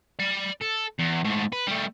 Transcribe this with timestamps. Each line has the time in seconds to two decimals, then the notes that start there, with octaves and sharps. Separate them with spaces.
0.19 D5 B5
0.62 A4
0.99 E2
1.25 G#2 A3
1.53 B4
1.67 G3 A3